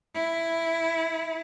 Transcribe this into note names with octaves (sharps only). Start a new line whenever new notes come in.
E4